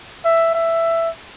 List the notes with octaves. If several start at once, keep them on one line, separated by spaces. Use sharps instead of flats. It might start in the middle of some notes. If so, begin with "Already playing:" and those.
E5
E5